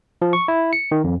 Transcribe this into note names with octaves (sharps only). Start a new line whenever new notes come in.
F3
C#6
E4
C#7
D#3
F2